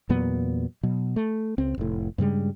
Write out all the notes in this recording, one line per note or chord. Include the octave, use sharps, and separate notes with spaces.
E2 A#2 F#3 B3
B2 F#3
A3
C#2 C4
F1 A2
G2 C#3 G3 G#3